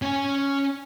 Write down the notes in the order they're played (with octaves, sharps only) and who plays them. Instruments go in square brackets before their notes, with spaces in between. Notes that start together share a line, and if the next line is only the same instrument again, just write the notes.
[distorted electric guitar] C#4 G#5